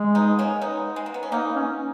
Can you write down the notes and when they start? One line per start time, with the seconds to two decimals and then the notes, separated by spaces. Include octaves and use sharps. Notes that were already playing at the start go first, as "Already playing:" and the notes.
Already playing: G#3
0.15 B3 D#4
0.39 A#3 C#4
0.61 B3 D#4
0.96 G#3
1.06 A#3
1.14 B3
1.23 C#4
1.32 A#3 B3 D#4
1.56 C#4